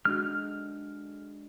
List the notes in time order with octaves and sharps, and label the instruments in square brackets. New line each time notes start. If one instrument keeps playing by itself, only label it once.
[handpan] G#3 D4 F#4 [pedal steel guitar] F6